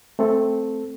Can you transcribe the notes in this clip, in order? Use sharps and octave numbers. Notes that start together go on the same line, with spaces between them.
A3 C4 A4